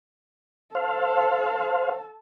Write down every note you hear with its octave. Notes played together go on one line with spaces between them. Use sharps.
A4 C5 F5 A5